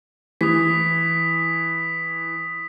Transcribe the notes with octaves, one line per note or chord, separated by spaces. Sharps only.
E3 D#6 B6